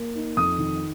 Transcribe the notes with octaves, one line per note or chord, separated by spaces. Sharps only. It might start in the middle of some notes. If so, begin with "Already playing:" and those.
Already playing: A#3
D#4
F2 D#6
D#3